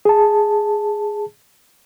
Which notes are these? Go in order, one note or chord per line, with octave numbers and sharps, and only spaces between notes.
G#4 A5